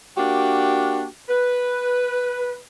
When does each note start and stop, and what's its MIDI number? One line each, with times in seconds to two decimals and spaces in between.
0.17 1.06 58
0.17 1.06 62
0.17 1.06 66
0.17 1.06 67
1.29 2.56 71